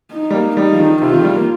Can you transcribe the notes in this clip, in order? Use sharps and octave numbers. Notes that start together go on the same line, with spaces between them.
D#4
G3
A#3
G3 D#4
F3
D#3
C3 F4
D#3
F3
G3
A#3